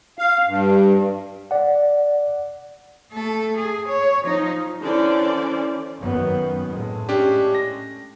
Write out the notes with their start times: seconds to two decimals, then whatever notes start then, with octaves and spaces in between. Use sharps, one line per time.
0.19 F5
0.47 G2
1.51 D5 F#5
3.12 A3 A4
3.57 G#4
3.88 C#5
4.23 F3 D#4
4.82 D3 E3 C#4 C5 D5
5.99 F#2 D#3 B3
6.70 A2 G#3
7.09 C#4 D4 G4
7.55 A#6